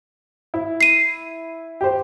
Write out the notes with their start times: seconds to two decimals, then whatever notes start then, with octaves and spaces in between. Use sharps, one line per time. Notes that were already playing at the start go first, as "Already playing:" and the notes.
0.54 E4
0.81 C7 D#7
1.81 G4 C5